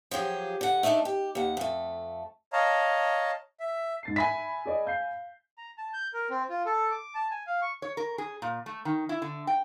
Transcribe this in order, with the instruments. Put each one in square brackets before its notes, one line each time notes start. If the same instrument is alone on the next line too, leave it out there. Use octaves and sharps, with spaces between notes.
[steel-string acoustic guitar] F3 F#3 G4 G#4
D3 F#5
A3 D4 D#4 A4 A#4
G4
D#2 F#5
F2 A3
[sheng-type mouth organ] C#5 D#5 F5 A5 A#5
E5
[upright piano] G#2 A6 C7
[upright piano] E5 [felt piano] G#5 B5 B6
[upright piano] G#4 D5 D#5
F5 G6 C7
[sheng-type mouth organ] A#5
A5
G6
A#4
C4
F4
A4
D6
A5
G#5
F5
C#6
[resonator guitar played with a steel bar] C#5
A#4
G#4
A#2
A3
D#3
E4
D3
G5